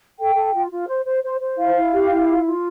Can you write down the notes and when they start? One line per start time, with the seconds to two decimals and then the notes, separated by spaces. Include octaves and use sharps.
0.19 A4 G5
0.36 A4
0.54 F4
0.71 F4
0.88 C5
1.05 C5
1.23 C5
1.40 C5
1.58 E4 F5
1.75 E4
1.93 G4
2.10 E4
2.27 F4
2.45 F4